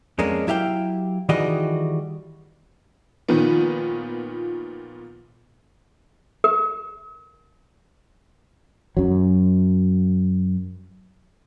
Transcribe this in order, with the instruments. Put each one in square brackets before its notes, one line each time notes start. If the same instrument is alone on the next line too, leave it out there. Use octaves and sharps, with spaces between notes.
[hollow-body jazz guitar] F2 G#3 A#3 C#4 D4
F#3 E4 G4 F5 G5
D#3 E3 G3 F#4 G#4 D#5
[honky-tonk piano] A#2 D#3 F3 B3
[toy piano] A#4
[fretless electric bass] F#2 F#3